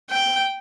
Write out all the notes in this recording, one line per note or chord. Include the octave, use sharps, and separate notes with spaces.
G5